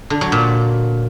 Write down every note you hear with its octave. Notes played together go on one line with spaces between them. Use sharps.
D3
F#3
A#2